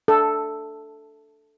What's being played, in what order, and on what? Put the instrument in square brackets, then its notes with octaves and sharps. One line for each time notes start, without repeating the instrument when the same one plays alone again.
[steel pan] A4